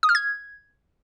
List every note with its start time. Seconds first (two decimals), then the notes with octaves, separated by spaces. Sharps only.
0.03 D#6
0.09 F6
0.15 G#6